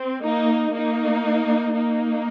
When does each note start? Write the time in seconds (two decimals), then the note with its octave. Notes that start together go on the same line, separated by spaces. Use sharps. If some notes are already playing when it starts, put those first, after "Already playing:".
Already playing: C4
0.23 A#3 D#4
0.74 A#3 D#4
1.76 A#3 D#4